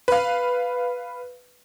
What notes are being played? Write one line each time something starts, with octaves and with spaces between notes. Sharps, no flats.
B4 F5